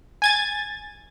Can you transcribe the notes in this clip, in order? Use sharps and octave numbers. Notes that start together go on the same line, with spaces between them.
G#5 G#6 A6